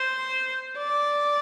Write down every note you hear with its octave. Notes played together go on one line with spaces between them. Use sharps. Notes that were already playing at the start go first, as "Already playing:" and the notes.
Already playing: C5
D5